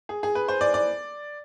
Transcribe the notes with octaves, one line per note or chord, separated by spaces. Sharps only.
G#4
G#4
B4
C5
D5
D5